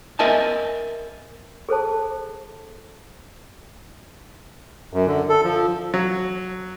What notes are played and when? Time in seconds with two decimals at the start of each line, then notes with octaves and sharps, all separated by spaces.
0.19 A#4 D#5 E5 G#5 A5
1.69 G#4 A4 C5 A5
4.93 F#2
5.06 D3
5.29 A4
5.43 F3
5.94 F#3